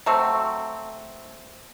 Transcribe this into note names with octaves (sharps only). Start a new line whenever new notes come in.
F#3 A3 C4